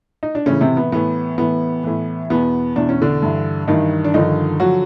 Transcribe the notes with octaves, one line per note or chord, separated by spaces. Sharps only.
D#4
D4
A2 C#3 E3 C#4
C3 C4
B3
A2 E3 B3
A2 E3 B3
A2 E3
E2 B2 B3
E2 B2 D4
C#4
D3 D4
G2 E3
G2 D#3 E3 D#4
D4
G2 D3 D#3 F3 D#4
D3 F3 F#3 F#4